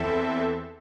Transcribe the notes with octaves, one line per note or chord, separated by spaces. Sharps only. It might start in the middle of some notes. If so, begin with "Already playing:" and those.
Already playing: E2 E3 C4 A4 E5